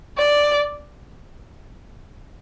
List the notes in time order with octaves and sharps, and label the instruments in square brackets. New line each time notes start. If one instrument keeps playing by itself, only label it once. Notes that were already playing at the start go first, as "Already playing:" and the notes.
[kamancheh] D5